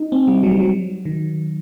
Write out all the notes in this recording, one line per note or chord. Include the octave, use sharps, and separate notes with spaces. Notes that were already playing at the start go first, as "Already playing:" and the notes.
Already playing: D#4
C4
G3
F#3
G3
F#3
D#3